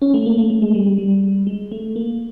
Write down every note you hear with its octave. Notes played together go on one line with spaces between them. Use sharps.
C#4
A3
A#3
A3
A3
G#3
G3
G3
G3
G#3
A3
A#3